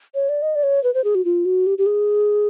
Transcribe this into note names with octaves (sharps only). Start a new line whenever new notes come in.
C#5
D5
D#5
D5
C#5
B4
C5
G#4
F#4
F4
F#4
G4
G4
G#4